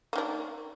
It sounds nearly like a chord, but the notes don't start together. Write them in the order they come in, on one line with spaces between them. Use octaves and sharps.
A#3 D#3 D4